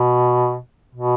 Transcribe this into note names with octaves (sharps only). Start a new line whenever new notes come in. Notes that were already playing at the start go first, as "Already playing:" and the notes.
Already playing: B2
B2